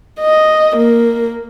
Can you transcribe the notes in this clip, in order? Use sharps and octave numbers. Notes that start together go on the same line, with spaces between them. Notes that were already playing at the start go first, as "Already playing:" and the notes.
D#5
A#3